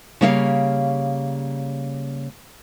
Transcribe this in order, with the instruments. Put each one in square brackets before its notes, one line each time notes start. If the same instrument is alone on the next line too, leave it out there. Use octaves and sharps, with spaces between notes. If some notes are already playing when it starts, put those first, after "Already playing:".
[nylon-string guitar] C#3 G3 A#3 C#5 D#5 F5